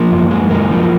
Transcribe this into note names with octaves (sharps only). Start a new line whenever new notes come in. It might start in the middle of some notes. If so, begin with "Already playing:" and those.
Already playing: F3 A#3
F#2
G#3
F#2 A#3
F3